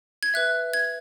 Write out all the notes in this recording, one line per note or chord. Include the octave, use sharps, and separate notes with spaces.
G#6
B4 E5 F#6
G#6